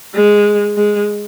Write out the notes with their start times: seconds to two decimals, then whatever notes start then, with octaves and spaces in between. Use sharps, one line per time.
0.14 G#3
0.77 G#3